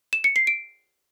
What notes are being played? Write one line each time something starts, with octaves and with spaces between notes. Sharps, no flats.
E7
C#7
C7
D7